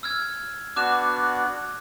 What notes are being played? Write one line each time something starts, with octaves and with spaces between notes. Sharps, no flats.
E6 F6 G#6
B3 D4 F#4 D6 F#6 E7